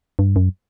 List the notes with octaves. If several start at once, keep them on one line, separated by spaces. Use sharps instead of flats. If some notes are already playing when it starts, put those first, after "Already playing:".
G2
F#2